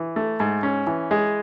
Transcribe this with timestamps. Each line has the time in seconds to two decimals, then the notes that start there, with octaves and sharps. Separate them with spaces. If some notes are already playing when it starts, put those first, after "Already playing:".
Already playing: E3
0.16 A3
0.40 G#2
0.63 C#4
0.87 E3
1.11 G#3